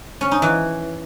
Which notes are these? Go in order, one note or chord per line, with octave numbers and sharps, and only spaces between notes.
C#4
D#4
E3